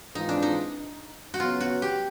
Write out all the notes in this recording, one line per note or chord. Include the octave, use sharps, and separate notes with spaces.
G#2 E3 G#3 C4 D#4 F4
D4
D#4
F#4
C#3 F#3 B3 F4
F#4
G4